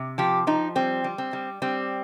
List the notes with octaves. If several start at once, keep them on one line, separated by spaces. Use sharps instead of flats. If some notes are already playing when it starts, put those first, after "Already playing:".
Already playing: C3
F3 G4
F3 D#4
G3 C4
G3
C4
G3
G3 C4